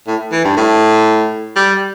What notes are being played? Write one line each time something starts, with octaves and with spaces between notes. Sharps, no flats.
A2
E3
G2
A2
G3